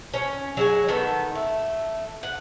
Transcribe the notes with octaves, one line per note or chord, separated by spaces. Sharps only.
C#4
F#3 G#3 G#5
D#3 B3 A4
A3
F#5